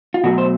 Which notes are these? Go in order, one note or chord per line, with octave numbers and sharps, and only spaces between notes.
F4
B2 F#3 A3 F#4
C5